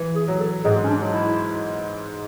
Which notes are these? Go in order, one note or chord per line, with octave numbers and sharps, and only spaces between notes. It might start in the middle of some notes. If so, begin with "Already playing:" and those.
Already playing: E3
G#4
F#3
A4
G#2 G#3 G#4
C#4
D4
F#3
E4